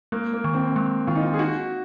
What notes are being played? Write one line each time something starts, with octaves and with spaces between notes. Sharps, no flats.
G#3 A#3
A#3
D#3
C4
G#3
D#3 F4
D#4
F4
G#4
D#4 F#4